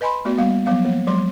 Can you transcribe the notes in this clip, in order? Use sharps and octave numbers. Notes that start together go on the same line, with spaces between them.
B4 D#5 G#5 B5 C6
A3 B3 F#4 D5
G3 A#3 B3 F5
F3 F#3 B3 F5
F3 A#3
F3 F#3 G#3 C6